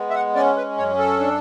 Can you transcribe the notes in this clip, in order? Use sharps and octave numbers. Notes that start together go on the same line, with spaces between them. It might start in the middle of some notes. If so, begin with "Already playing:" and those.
Already playing: G#3 B3
E5
F#5
C#4 D5
B4
F#2 C#5
A4
D4